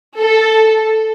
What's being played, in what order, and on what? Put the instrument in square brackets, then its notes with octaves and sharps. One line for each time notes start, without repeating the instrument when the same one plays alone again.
[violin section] A4